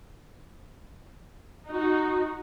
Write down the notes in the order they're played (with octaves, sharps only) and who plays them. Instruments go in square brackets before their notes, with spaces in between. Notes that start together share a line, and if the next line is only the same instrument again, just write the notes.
[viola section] D#4 F#4